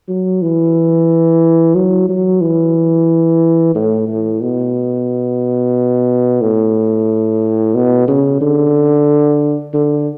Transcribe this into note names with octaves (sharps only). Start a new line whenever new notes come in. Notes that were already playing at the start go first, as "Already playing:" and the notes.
F#3
E3
F#3
F#3
E3
A2
A2
B2
A2
B2
C#3
D3
D3